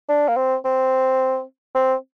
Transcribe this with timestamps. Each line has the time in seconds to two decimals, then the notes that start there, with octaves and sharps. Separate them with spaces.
0.09 D4
0.28 A#3
0.36 C4
0.65 C4
1.75 C4